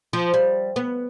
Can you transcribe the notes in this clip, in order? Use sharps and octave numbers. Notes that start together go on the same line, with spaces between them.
F3
G3
B3